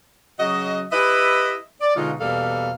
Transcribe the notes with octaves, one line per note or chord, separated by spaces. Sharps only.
C#3 F#3 F#4 D#5
E4 G4 B4 D#5 E5
D5
B2 D3 G#3 D#4 F4
E2 B2 G3 A#3 A4 F5